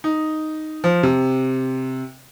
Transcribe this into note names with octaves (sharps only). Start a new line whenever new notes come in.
D#4
F3
C3